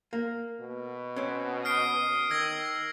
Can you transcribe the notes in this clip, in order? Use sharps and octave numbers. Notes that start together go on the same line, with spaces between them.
A#3
B2
C4 C#4
D#6 F6 C7 D7
D#3 E6 G#6 A#6